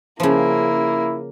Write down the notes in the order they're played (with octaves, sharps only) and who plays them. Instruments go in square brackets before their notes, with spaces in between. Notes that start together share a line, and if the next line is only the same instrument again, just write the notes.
[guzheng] C#3 F3 [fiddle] A#3 [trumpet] E4